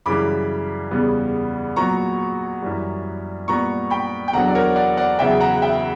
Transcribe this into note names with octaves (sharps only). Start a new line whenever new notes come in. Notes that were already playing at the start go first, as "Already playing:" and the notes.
F#2 C#3 E3 G3 B5 D6
E2 C#3 G3 B3
A#2 F#3 B3 A#5 C#6
F#2 E3 G3
A#2 G3 B3 A#5 C#6
G5 B5
G5
E2 D3 F#3 F#5 A#5
D5
A#4 C#5
D5 F#5
D5 F#5
E2 C#3 F#3 B3 E5 G5
F#5 A#5
E5 G5